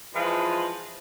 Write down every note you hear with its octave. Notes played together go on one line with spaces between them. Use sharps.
E3 F3 G#3 F4 B4